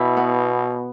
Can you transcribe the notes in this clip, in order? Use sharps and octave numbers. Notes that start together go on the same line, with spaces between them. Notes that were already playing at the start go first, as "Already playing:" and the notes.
Already playing: B2 E4
B3